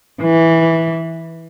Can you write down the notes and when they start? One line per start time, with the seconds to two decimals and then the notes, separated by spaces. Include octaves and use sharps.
0.22 E3